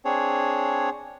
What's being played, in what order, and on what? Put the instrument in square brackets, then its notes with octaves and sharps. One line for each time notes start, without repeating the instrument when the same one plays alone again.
[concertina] C4 D4 G#4 C#5